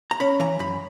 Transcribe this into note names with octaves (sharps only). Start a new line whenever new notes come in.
A#5
C#4 B5
E3 A#5
F#2 B5